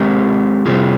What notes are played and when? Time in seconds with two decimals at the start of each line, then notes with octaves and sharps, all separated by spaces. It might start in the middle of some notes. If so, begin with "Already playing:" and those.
Already playing: G#3 C4 G4 A#4
0.66 C3 G3 C4 F4 G#4